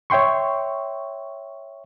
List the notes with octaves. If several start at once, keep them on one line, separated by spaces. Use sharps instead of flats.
C#5 E5 G5 C6 C#6